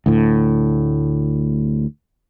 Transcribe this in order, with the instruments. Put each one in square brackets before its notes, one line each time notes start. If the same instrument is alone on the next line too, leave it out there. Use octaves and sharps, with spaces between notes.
[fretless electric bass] D2 A2